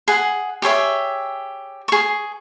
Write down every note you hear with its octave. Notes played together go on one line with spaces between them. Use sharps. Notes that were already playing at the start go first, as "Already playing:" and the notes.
G#4 F#5
G4 G#4 C#5 E5
G#4 C#6